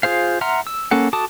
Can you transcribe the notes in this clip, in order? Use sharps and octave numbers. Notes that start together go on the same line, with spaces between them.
F4 G#4 C5 F5
E5 F#5 A#5 C6 F6
E6
A#3 C#4 A4 F#5
F#4 A4 A5 D6 D#6